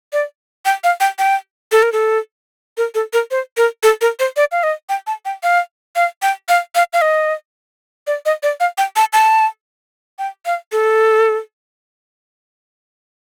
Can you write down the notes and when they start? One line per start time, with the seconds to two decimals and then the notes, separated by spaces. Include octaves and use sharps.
0.13 D5
0.65 G5
0.84 F5
1.00 G5
1.19 G5
1.72 A4
1.82 A#4
1.92 A4
2.77 A#4
2.95 A4
3.13 A#4
3.31 C5
3.57 A#4
3.83 A4
4.01 A#4
4.19 C5
4.37 D5
4.52 F5
4.63 D#5
4.89 G5
5.07 A5
5.25 G5
5.43 F5
5.96 F5
6.22 G5
6.49 F5
6.75 F5
6.93 F5
7.02 D#5
8.07 D5
8.26 D#5
8.43 D5
8.60 F5
8.78 G5
8.96 A5
9.13 A5
10.19 G5
10.46 F5
10.72 A4